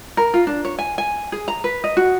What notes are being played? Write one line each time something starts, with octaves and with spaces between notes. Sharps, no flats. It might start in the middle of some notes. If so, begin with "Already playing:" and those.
A#4
F4
D4
C#5
G#5
G#5
G#4
A#5
B4
D#5
F#4